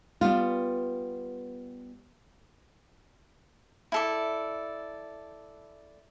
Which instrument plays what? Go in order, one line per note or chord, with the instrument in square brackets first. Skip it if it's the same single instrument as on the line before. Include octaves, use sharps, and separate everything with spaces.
[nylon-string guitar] G3 B3 F4
[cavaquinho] E4 A4 D5